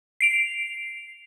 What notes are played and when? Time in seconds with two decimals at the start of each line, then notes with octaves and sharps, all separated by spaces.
0.21 C7 D7 F7